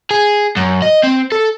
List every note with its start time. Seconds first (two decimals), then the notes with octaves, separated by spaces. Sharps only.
0.11 G#4
0.57 F#2
0.82 D#5
1.03 C4
1.32 A4